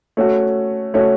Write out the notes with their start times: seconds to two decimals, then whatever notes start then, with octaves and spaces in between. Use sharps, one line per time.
0.17 A3 C#4 F#4
0.94 A3 C#4 F#4